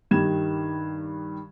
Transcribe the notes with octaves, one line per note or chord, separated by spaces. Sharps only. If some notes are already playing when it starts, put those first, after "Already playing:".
G2 D#3 G3 G#6 E7